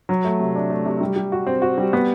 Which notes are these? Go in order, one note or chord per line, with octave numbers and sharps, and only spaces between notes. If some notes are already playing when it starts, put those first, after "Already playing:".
F#3
A3
C3
D4
A3
C3
G3
G3
F#4
C4
F#4
G3
B3